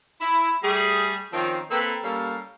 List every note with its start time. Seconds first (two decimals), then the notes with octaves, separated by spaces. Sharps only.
0.21 E4
0.63 G3 A3 G#4
1.33 D#3 F3 C4 C#4 D#4 F4
1.71 A#3 C4 A4 B4
2.03 G3 A#3 C#4 A4 F5